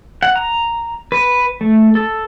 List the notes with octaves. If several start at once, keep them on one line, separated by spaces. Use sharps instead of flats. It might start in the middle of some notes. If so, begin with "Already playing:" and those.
F#5
A#5
B4
A3
A4